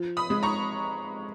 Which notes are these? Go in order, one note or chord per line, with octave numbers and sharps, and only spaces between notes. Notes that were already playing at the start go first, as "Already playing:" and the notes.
Already playing: F3
B5 D#6
G#3
A#5 C#6